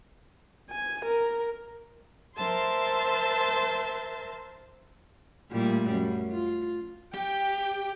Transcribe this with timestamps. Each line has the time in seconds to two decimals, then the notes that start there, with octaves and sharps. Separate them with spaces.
0.71 G#5
1.05 A#4
2.36 A#4 C5 E5 A5 C6
5.51 A#2 G3 A3
5.89 F#2
6.31 F4
7.14 G4 G5